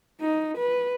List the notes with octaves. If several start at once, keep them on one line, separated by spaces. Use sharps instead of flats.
D#4
B4